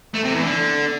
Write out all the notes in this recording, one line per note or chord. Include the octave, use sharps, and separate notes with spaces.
A3
C3
E2
D3